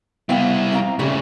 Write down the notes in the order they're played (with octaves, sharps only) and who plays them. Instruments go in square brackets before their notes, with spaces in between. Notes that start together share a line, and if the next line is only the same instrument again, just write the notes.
[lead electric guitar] G3 E4 [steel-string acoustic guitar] B3 F5 G5
[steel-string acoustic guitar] C4 F5 A#5
[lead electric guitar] C#3 A3 [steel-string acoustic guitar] G3 E4 G4